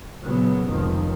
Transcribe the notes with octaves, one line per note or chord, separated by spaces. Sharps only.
A#2 C#3 F#3 B3
F1 C#2 D#3 F3